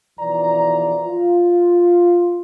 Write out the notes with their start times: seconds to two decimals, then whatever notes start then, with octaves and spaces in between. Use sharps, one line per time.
0.20 B1 E3 F3 D5 A#5
1.05 F4